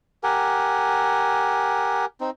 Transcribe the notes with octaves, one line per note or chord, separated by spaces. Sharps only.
G4 A#4 F#5 G#5
C4 D#4